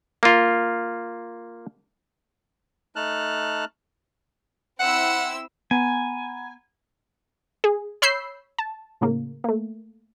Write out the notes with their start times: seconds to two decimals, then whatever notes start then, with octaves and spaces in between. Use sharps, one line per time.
0.23 A#3 F4
2.96 A3 D#4 A5 F6 F#6
4.79 C4 E4 F#5 E6
5.71 B3 F#5 G#5 A#5 B5
7.64 G#4
8.02 C#5 B5 E6 G6 C7
8.58 A5
9.01 A2 C#3 A#3
9.44 A3 A#3